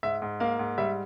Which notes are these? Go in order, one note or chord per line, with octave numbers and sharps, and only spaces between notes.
G#2 E5
G#2
A#3 F5
G#2
G3 E5